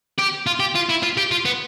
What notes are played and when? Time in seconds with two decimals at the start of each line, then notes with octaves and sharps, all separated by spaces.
0.18 G4
0.46 F4
0.60 G4
0.75 F4
0.89 E4
1.03 F4
1.17 G4
1.31 F4
1.45 B3